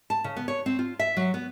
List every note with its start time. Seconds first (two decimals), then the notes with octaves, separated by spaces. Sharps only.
0.10 A5
0.24 C#3
0.36 B3
0.48 C#5
0.66 C4
0.79 F4
0.99 E5
1.17 F#3
1.34 B3